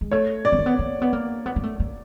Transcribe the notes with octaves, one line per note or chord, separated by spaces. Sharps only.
G#3
A3 C#5
D5
B3
A#3
B3
A#3
B3
A#3
B3
A#3
A3
A#3